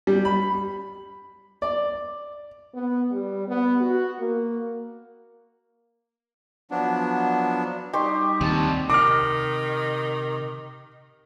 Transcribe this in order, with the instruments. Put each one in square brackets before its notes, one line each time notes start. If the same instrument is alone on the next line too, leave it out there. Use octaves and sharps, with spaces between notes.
[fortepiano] G3
B5
D5
[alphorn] B3
G3
B3
F#4
A#3
[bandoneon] F3 F#3 B3 D4
[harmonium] G3 D#4 [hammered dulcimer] G4 C6 C#6
[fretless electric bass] D#2 [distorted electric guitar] C3 A5
[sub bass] C3 [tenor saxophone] D#3 [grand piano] D6 F6